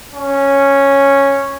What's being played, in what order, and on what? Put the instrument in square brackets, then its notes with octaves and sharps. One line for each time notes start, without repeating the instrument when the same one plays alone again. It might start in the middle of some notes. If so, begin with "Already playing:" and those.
[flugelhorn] C#4